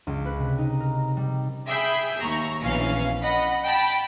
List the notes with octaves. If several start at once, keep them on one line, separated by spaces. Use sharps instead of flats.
C#2
B4
C3
D#4
A#4
G3
G#4 E5 G5 B5
D#2 A#5 C#6
A#1 B2 E3 C#4 F5
D#5 F#5 B5
G5 A5 B5